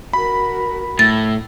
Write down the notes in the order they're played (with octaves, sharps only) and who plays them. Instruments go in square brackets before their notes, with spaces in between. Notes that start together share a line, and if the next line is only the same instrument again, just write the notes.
[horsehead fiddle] F#4 A#4 [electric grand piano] B5
[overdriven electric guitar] A2 [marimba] A6